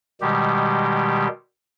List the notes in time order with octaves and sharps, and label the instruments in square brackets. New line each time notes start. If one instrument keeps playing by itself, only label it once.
[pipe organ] B2 D#3 G3 G#3 G4